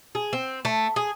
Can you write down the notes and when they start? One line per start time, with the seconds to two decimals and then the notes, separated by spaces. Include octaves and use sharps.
0.15 G#4
0.33 C4
0.65 A3
0.96 G#4